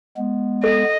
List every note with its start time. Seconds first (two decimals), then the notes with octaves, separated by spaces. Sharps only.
0.17 G#3 B3
0.64 A4 D#5